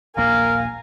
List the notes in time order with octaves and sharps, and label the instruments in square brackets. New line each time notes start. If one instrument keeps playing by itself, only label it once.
[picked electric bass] D#1 A#1 A#3 [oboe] A#4 [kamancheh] F5 G#5